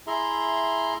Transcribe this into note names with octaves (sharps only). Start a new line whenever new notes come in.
E4 G#4 E5 A#5 C6